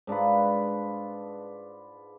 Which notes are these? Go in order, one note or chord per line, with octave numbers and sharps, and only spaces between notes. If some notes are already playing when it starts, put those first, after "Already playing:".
G#2 D4 F4 B4